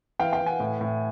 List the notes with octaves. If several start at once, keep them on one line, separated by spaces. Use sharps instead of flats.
E3 F5 G5
F5 G5
E3
F#5 G#5
A2
A2